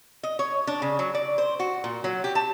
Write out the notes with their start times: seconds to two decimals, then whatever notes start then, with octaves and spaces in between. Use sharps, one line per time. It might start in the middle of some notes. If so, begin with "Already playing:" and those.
0.23 D#5
0.39 C#5
0.67 D4
0.82 C#3
0.99 F#3
1.15 D5
1.38 C5
1.59 F#4
1.84 A#2
2.04 F#3
2.24 G4
2.35 A5